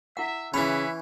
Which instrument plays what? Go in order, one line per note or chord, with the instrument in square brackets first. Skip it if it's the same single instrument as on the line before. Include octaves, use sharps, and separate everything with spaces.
[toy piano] E4 F#5 [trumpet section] E5
[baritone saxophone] C#3 [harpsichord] E3 C#4 [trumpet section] B4 C#5 E5 [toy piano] B5